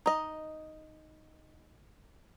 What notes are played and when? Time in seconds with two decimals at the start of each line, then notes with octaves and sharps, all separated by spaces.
0.06 D#4 D#5